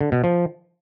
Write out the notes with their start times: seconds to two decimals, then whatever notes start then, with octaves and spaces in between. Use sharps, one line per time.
0.01 D3
0.12 B2
0.24 F3